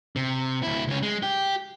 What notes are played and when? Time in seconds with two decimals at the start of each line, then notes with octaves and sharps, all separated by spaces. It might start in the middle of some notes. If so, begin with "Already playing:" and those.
0.16 C3
0.63 D2 E4
0.88 C#2 C#4
1.03 G#3
1.23 G4